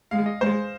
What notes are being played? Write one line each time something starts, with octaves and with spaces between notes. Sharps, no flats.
G#3 F5
D#5
G#3 C5